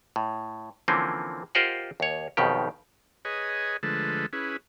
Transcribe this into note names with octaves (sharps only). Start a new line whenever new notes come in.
A2
D3 E3 F3 A#3 C4 C#4
F4 G4 A#4 C5 D#5 F#5
D#2 C#5
B1 F2 B2 D#3 G4
G#4 B4 C#5 D#5 G#5
D3 F3 G#3 A3 A4 B4
C#4 E4 G#4 B4